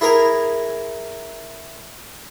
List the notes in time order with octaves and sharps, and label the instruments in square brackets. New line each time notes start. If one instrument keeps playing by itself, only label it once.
[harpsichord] E4 G#4 A#4 A#5